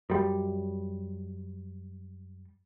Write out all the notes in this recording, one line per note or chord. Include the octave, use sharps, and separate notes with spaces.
F#2 G3